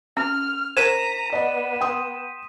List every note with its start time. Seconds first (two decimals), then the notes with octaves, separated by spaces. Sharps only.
0.17 C#4 F6
0.77 A#4 C5 A#5 B6 D#7 E7
1.33 B3 D5 D#5
1.81 G5 C6 D#6